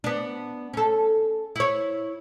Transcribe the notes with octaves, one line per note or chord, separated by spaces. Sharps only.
B3 D4
C#4 A4
E4 C#5